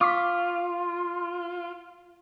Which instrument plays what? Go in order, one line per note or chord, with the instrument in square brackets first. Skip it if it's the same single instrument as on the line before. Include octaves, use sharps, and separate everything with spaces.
[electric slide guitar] F4 [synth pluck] C#6 D6 B6